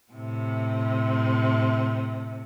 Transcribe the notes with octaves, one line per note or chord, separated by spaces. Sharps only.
A2 C3